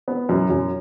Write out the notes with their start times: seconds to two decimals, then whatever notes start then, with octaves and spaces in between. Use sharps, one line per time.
0.08 B3
0.29 F#2
0.50 F#2